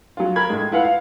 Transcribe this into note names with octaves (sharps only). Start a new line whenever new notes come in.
F#3 F4
A#4 B5 G#6
A2 G#3
E4 F4 B4 F5 F#5
F5